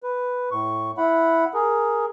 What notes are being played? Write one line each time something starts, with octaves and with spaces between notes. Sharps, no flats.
B4
A2 C#6
E4 F#5 B5
G#4 A#4